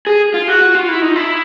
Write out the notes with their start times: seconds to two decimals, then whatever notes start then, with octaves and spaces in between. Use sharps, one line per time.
0.07 G#4
0.34 F4
0.48 F#4
0.61 F#4
0.75 F4
0.89 E4
1.02 D#4
1.16 E4